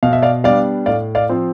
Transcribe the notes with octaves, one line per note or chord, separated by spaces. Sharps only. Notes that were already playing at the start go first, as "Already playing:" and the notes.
B2 F5
E5
D5 F5
G3 B3 D4 D5 F5
A2 D5 F5
D5 F5
F3 C4